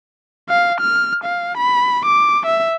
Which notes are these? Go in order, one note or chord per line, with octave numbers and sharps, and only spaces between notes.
F5
F6
F5
B5
D6
E5